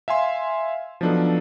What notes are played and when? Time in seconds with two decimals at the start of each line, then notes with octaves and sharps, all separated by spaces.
0.08 E5 F5 G#5 C6
1.01 F3 F#3 B3 D4 D#4 A4